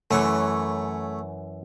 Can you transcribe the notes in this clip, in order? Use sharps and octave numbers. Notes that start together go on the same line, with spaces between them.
F#2 E3 A3 C#5